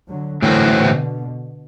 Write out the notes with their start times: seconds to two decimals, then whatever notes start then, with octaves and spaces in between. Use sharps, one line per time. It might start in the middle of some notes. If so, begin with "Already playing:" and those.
0.09 D3 F#3
0.42 A2 D3 E3 F#3 A3 C4 F#4
0.76 B2 D3